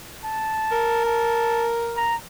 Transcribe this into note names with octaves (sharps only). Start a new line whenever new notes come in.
A5
A#4
A5
A#5